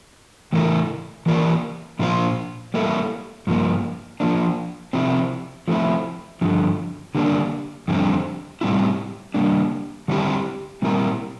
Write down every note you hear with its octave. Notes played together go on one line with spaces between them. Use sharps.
A2 E3 A3 E4 A#4
E3 A#3 F4 A#4 D5
A#2 F3 A#3 F4 C5
G3 A#3 E4 A4
G2 F3 A#3
F3 A#3 D4
C3 F3 C4 E4
F3 A3 C4 E4
G2 D3 F3
D3 G3 A#3 D4
F2 D3 G3 C4
A2 G3 C4 E4
G3 A#3 D4
D3 G3 C4 E4 G4
A#2 G3 C4 E4 A#4